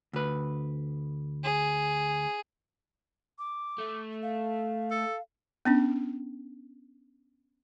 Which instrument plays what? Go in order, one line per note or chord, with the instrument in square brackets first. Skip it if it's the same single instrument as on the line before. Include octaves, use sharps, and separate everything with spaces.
[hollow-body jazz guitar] D2 B4
[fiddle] G#4
[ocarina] D6
[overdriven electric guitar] A3
[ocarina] F5
[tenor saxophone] A4
[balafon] B3 C#4 D4